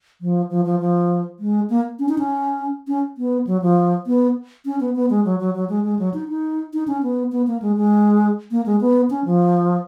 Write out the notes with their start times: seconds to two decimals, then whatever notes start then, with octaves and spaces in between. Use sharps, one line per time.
0.21 F3
0.51 F3
0.65 F3
0.80 F3
1.40 G#3
1.70 A#3
1.99 C#4
2.09 D#4
2.18 C#4
2.88 C#4
3.18 B3
3.47 F#3
3.62 F3
4.07 B3
4.66 C#4
4.80 B3
4.96 B3
5.10 G#3
5.25 F#3
5.40 F#3
5.54 F#3
5.69 G#3
5.85 G#3
5.99 F#3
6.14 D#4
6.29 D#4
6.74 D#4
6.88 C#4
7.03 B3
7.32 B3
7.47 A#3
7.62 G#3
7.77 G#3
8.51 A#3
8.66 G#3
8.81 B3
9.10 C#4
9.25 F3